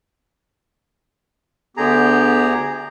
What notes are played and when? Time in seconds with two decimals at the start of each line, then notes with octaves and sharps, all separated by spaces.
1.77 D2 D3 B3 G4 G#4 A#5